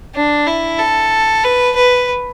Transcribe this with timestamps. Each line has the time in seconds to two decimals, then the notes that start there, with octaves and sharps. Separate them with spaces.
0.14 D4
0.46 E4
0.79 A4
1.44 B4
1.75 B4